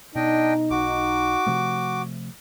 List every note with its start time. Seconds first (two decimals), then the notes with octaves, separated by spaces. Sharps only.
0.16 B2 D4 D#4 D#5 G5
0.71 B1 F#4 D6
1.47 C3 F3 A3